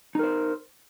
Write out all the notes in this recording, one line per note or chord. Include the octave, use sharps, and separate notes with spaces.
D#4 A#4 C5